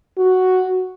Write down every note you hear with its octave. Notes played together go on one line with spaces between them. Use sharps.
F#4